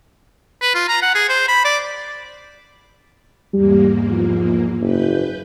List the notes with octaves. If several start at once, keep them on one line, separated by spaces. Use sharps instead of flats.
B4
F4
A#5
F#5
G#4
C5
B5
D5
E2 G#2 G3 A#3
F3
F#1 B4 G6